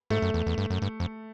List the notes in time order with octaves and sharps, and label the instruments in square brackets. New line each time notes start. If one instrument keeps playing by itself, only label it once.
[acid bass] G#2 [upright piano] A3
[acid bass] F#2
E2
E2
G2
F#2
G2
F2